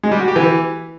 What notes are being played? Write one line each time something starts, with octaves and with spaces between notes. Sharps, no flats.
G#3
G3
F#4
G4
E3